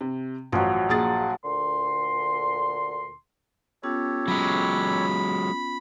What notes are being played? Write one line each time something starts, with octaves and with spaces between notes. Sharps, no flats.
C3
A1 F3 F#3
A#1 G#4 A6
D2 A#2 D3 C6
B3 C#4 F4 G4 A4 C#5
F#3 G#3 B5